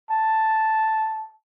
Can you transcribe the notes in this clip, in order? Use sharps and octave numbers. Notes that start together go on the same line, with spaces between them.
A5